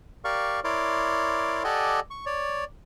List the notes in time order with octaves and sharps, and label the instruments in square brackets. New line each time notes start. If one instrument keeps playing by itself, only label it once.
[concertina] G4 A#4 D5 F5 C#6
E4 A#4 C#5 D5 C6 D6
G4 A4 D5 D#5 F#5 G#5
C#6
C#5 D5